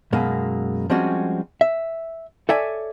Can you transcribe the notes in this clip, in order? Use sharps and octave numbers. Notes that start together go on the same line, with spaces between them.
F#2 B2 G#3 A#3
F3 G3 G#3 C4 C#4 F#4
E5
A4 C#5 D5 E5 G#5